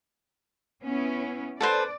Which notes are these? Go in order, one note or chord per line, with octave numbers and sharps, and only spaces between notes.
B3 C#4 E4
A4 B4 C5 D5